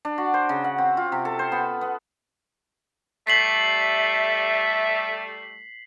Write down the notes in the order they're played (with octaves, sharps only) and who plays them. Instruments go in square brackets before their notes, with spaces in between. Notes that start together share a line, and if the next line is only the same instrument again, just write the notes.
[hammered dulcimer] D4
F#4
C5
C#3
F#5
C4
F4
C3
A4
C5
B3
B3
[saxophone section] G3 A3 [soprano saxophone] E5 [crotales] B6 C7 F#7